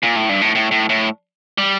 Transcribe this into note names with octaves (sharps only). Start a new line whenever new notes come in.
A#2
A2
G2
A2
A2
A2
A2
G3